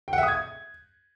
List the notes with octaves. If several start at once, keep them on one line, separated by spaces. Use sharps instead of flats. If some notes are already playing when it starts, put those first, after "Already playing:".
G5
F#5
E5
D#6
G#6